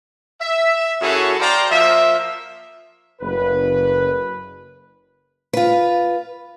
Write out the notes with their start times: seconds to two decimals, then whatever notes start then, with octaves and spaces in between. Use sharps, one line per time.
0.41 E5
1.01 F#2 E4 F#4 G#4 A4 C#5
1.39 C5 D5 F5 G5 A5 A#5
1.71 F3 A#3 A#4 E5
3.21 F#1 B4
5.53 F4 B4